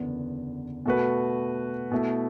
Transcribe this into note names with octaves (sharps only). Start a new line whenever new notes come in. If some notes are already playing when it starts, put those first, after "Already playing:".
Already playing: F#1 E2 D3 B3
B2 A3 F#4 B4
B2 A3 E4